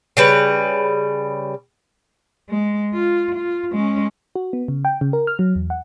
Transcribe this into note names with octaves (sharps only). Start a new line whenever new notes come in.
C#3 G3 B4
G#3
F4
F4
G#3 C#4
F#4
B3
C#3
G5
C#3
A#4
F6
F#3
E2
F#5